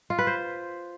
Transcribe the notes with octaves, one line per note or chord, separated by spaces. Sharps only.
F4
B4
C5